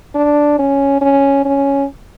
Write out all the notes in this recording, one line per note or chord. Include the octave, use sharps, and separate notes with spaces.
D4
C#4
C#4
C#4